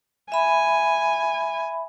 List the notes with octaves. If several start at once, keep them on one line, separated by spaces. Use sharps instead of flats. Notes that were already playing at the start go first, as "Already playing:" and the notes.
E5 G#5 B5